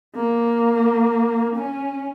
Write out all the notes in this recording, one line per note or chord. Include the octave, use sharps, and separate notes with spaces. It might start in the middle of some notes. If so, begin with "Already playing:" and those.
A#3
C#4